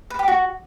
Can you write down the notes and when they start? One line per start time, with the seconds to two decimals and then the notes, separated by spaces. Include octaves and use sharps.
0.10 B4
0.19 G4
0.28 F#4